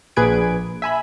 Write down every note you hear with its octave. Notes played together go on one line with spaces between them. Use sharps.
A#1 A#2 G#4 B4 G#6 D7
E5 G#5 B5